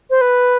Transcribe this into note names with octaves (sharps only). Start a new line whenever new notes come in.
C5
B4